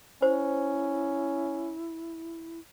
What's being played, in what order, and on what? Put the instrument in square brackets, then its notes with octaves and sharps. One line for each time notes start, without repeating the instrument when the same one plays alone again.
[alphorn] C#4 [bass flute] E4 [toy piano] C5